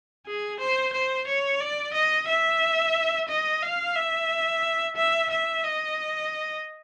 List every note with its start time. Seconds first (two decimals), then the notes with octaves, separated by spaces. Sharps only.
0.27 G#4
0.60 C5
0.94 C5
1.28 C#5
1.61 D5
1.94 D#5
2.29 E5
3.29 D#5
3.62 F5
3.96 E5
4.97 E5
5.31 E5
5.64 D#5